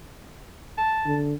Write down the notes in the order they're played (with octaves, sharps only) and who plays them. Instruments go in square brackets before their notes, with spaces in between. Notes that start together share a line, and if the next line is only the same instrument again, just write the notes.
[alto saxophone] A5
[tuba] D3